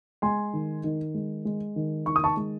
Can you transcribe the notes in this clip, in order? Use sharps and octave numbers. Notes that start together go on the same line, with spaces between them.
G#3 G#5 C6
D#3
D#3
G#3
G#3
D#3
D#3 C#6
D#6
A5 C#6
G#3